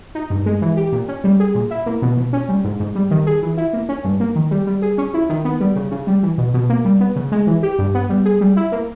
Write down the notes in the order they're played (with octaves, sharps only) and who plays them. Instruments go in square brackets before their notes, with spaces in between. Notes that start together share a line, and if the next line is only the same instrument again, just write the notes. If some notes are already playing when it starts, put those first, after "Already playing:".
[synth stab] D#4
G2
G#3
E3
G4
A#2
C#4
G3
G#4
A#2
E4
A#3
B2
B2
C#4
G3
G#2
G#2
G3
D#3
G#4
E3
E4
A#3
C#4
G2
A#3
D#3
G3
G3
G#4
C#4
E4
D#3
B3
G3
C#3
C#3
G3
E3
B2
B2
A#3
G3
B3
C#3
G#3
E3
G4
G2
B3
G3
G#4
G3
E4
A#3